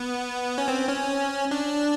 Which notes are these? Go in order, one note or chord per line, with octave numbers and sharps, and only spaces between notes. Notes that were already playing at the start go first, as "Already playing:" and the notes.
Already playing: B3
C#4
C4
C#4
D4